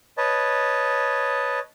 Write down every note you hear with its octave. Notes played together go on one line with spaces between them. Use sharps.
B4 C#5 D#5 A5